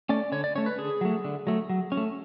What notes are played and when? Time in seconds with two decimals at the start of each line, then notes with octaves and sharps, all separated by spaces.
0.09 A3 C#4 D5
0.32 D3 C#5
0.44 D5
0.55 A3 C#4 C#5
0.66 B4
0.78 D3 G#4
1.01 F#3 A3
1.24 D3
1.47 F#3 A3
1.69 F#3
1.92 C#4
1.97 A3